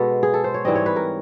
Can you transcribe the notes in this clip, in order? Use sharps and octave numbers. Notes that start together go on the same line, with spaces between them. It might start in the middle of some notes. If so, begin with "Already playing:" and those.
Already playing: B2 G#3 B3 A4
G#4
A4
C5
C#5
G#2 E3 G3 C4 D#5
C#5
B4
A#4